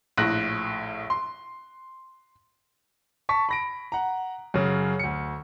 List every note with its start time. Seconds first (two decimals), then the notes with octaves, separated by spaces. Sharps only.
0.18 A#1 A2 F#6 A#6
1.10 C6
3.29 A5 C#6 B6
3.49 B5 A#6 D7
3.92 F#5 A#5
4.54 F#2 C#3
4.99 D2 C#7